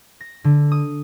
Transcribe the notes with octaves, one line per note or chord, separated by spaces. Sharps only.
A#6
D3
D#6